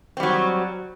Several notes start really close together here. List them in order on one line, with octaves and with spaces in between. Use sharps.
C4 G3 F#3